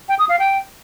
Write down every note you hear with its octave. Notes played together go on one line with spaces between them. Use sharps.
G5
D#6
F5
G5